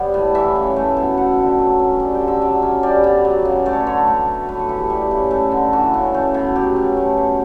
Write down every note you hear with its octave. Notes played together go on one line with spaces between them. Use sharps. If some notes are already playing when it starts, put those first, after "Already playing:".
Already playing: G3 B3 C#5
A2
E3 E5
C#3
A3
B2
A3 F#5
G5
D3
F#3
C#4
G3 A5
G5
D3
E5
F#3 D5
C#4
G3 D5
B2
F#3
C#3
A3 D5
C#5
B4
D3 C#5
A3
B2
A3 B4
A4
E3 G4
A4
G3 G4
C#3
A3
D3
E3 F#4
C#3
A3
B2
F#3 G4
C#4
A3
B2